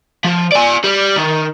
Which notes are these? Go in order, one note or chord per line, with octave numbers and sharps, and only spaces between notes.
F3
D5 G#5
G3
D#3